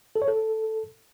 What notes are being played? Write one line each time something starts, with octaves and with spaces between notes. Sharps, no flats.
A4
C#5
A4